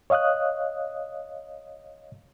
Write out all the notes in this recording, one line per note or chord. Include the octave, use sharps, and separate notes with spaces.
C#5 D#5 F5 D#6 F#6